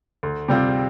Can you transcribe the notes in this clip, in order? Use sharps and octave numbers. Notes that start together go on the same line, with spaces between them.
D2
C3 G3 C4 F4